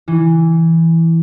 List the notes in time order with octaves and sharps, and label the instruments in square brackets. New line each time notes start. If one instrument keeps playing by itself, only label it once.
[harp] E3